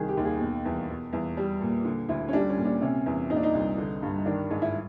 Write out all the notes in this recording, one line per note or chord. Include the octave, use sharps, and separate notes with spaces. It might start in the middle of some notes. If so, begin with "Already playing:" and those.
Already playing: C2 D#3 G#4
G4
D#2
G#4
B2
E2
B2
E2
G3
A#2
D3
D2 E4
C#4
G3 D4
C#4
A#2
D4
C3 C#4
E2
A#2 D#4
D4
D#4
C2
D3
G2
D#3 D4
G#2
E4